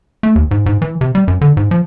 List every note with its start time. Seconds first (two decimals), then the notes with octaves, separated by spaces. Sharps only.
0.23 A3
0.36 D#2
0.51 G#2
0.66 G#2
0.82 E3
1.01 C3
1.15 G3
1.28 F#2
1.41 D3
1.57 G#2
1.71 F3